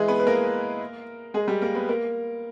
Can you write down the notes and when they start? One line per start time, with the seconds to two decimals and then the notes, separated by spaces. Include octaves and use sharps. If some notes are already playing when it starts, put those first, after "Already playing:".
Already playing: E3 G#3 E4 G#4
0.08 B3 B4
0.20 B4
0.27 A#3 A#4
1.34 G#3 G#4
1.48 G3 G4
1.62 A#3 A#4
1.75 B3 B4
1.89 A#3 A#4